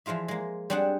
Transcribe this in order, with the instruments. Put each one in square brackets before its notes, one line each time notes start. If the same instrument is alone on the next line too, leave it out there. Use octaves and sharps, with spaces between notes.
[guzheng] E3 F3 G#3 F4 E5
G#3 A#3
G3 C4 D4 G#4 F#5 A5